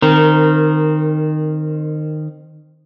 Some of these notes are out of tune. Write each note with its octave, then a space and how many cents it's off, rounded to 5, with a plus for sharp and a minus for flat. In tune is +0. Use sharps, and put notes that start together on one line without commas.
D#3 -20 C4 +0 A#4 +0